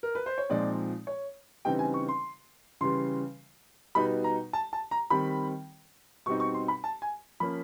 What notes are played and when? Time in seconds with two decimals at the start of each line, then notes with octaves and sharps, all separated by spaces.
0.03 A#4
0.15 B4
0.26 C5
0.38 C#5
0.50 A#2 F3 G#3 C4 D#4 D5
1.07 C#5
1.65 C#3 E3 G3 C4 D#4 G5
1.79 G#5
1.94 C#6
2.08 C6
2.81 C#3 E3 G3 C6
3.95 B2 G3 B3 D#4 B5
4.24 A#5
4.53 A5
4.73 A5
4.91 A#5
5.10 D#3 G3 C4 B5
6.26 B2 G3 C4 D#4 C#6
6.40 C#6
6.54 C6
6.68 B5
6.84 A5
7.02 G#5
7.40 F3 A#3 C#4 B5